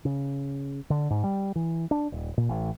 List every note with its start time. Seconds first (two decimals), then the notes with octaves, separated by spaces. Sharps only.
0.05 C#3
0.90 D3
1.10 G#2
1.24 G3
1.56 E3
1.91 D4
2.12 D#1
2.37 A#2
2.49 A1